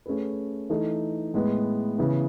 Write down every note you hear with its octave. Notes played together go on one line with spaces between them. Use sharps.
A3 C#4 G#4 B4
E3 A3 D#4 A4
A2 G#3 B3
C#3 E3 B3